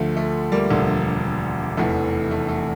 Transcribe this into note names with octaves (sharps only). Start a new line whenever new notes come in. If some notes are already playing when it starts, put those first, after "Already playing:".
Already playing: D2 D3 F3 A3
A3
G3 A#3
E1 D2 D3 F3
F1 E2 E3 A3
A3
A3